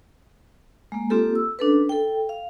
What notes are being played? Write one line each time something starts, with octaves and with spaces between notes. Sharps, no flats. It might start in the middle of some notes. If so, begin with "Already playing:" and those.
G#3 A#3
A#3 C4 F4 G4 A4
E6
C#4 D4 A4 B4
A4 G5
F5